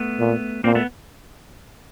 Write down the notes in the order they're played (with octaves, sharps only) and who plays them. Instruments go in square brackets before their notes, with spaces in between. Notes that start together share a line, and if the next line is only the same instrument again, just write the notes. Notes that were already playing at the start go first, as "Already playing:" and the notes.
Already playing: [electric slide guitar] A3 B3
[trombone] A#2
[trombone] A#2 [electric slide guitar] A#3 C4
[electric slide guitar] A3 B3